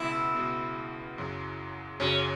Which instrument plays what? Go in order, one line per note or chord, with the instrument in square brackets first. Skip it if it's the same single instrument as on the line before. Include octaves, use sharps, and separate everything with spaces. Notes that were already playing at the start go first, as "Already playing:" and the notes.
Already playing: [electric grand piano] C#2 B2 B3 [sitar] E4
[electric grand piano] C#2 B2 B3
F#2 C#3 F#3
[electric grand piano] F#2 C#3 F#3 [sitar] C#4